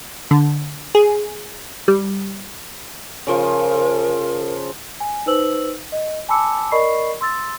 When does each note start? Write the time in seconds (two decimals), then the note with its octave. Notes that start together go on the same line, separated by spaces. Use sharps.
0.31 D3
0.95 G#4
1.88 G3
3.27 C#3 F3 A#4
5.00 G#5
5.26 D#4 B4 C5 E6 F#7
5.92 D#5
6.29 G#5 A5 B5 D6 E6 C#7
6.72 A#4 D5 D#5 B5 C#6 C7
7.21 C6 E6 A6